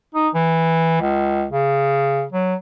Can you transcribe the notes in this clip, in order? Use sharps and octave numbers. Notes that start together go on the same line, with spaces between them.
D#4
E3
C#2
C#3
F#3